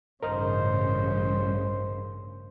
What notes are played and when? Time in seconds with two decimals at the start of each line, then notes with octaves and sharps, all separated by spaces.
0.23 A1 G2 C#3 A#4 C5 D#5 F6